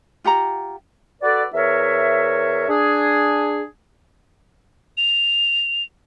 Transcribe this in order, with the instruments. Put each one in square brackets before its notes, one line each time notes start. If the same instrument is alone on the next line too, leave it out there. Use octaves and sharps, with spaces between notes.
[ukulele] F4 G4 F#5 A#5
[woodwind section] F#4 A4 B4 D5
E2 A#4 C#5 E5
D4 G#4
[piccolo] F7